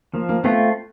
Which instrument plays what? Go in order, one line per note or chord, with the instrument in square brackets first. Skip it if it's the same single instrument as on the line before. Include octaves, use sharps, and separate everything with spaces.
[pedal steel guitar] F3 [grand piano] A#3
[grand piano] A#3
[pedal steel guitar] A3 C4 F4 [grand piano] B3